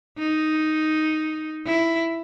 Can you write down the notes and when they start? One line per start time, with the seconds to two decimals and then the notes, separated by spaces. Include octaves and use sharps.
0.18 D#4
1.66 E4